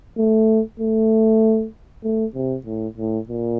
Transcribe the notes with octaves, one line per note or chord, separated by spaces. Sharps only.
A3
A3
A3
C3
A2
A2
A#2